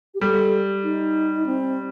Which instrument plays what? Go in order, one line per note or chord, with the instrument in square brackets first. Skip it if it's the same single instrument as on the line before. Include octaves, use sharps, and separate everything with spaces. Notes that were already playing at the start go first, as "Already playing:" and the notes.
[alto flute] G4
[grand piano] G3 [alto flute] A4
[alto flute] D#4
C4